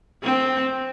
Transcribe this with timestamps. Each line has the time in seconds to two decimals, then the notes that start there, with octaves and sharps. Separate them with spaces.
0.23 C4